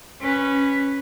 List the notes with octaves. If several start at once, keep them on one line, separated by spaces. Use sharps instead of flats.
C#4 B4